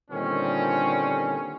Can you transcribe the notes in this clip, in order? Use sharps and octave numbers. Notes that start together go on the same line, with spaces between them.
A#2 D3 D#3 G3 C4 C#4